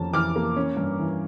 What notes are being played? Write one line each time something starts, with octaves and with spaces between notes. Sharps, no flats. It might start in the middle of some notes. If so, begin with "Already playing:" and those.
Already playing: F2 E3 A#3 C#4 A5
E3 D6 F6
A#3
C#4
G2
E3